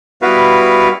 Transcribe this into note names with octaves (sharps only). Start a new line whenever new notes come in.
G3 B3 E4 F#4 B4 F5